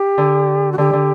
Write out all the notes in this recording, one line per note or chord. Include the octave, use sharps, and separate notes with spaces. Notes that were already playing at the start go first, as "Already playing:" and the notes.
Already playing: G4
D3
F#4
D3 G4
D3